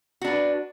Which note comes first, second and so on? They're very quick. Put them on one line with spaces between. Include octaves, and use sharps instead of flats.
F#4 D4 B4